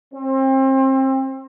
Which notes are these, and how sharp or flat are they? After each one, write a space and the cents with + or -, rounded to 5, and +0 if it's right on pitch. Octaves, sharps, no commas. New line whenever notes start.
C4 +30